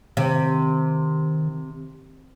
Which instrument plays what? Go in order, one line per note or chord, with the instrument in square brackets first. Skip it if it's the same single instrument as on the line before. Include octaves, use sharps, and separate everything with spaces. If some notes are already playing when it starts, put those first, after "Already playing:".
[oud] C3 [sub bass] D#3